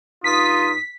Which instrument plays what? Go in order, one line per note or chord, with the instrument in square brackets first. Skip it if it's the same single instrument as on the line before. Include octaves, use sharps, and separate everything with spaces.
[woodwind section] G2 D#4 D#6 [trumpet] F4 [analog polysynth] B6